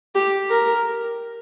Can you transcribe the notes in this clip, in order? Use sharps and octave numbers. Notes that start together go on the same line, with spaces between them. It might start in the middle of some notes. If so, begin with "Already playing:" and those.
G4
A#4